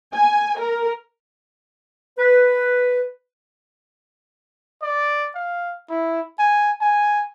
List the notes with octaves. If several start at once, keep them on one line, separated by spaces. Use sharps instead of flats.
G#5
A#4
B4
D5
F5
E4
G#5
G#5